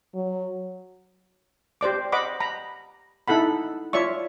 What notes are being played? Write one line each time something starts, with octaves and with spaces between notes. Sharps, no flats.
F#3
G4 C5 D5 D6
C5 D#5 F#5 B5 D6
A#5 B5
D#4 E4 A4 F#5 B5
F4 C#5 D5 E5 C#6